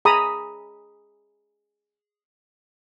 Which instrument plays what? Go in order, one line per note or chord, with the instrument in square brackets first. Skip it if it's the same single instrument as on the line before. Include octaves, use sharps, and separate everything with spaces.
[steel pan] G#4 A#5 B5 D#6